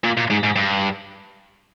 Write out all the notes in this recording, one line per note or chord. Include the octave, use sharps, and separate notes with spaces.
A#2
A#2
G#2
G#2
G2